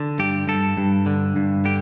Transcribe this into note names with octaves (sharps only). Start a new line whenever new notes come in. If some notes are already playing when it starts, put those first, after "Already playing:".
Already playing: D3
G2 G4
G2 A4
G2
D3
G2
D3 G4